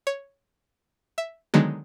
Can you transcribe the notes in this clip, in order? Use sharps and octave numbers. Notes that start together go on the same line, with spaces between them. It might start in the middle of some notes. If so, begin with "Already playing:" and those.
C#5
E5
D3 D#3 F#3 G#3 B3